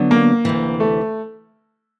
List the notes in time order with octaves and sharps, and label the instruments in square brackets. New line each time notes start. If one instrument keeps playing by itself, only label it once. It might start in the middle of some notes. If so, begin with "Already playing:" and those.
Already playing: [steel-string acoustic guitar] D3 F#3 B3
[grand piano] A#3
[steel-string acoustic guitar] D2 C3 E3
[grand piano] A3